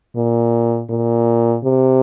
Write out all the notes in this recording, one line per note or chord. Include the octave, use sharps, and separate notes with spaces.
A#2
A#2
C3